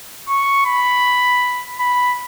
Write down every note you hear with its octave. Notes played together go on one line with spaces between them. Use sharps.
C#6
B5
B5